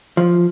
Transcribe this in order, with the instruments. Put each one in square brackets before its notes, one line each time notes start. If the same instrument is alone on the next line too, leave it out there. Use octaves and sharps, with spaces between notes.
[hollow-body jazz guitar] F3